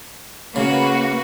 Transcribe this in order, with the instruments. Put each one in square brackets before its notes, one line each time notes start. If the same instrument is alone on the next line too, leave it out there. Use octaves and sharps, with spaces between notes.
[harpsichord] C#3 [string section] A#3 F#4 B4